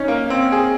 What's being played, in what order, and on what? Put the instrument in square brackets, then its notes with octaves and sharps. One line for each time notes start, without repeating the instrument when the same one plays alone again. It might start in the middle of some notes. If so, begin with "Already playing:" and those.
Already playing: [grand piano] C#4 D#4
A#3
C4
G#4